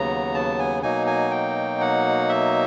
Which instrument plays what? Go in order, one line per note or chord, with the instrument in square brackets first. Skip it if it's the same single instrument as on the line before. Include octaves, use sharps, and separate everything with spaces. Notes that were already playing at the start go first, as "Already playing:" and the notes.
Already playing: [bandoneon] D#2 C#3 F#3 B3 A#5
A5
G#5
B2 F#3 A#3 D#4 G#5
G#5
G5
F#5
E5